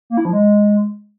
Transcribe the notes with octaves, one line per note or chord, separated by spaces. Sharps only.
A#3
E4
F3
G#3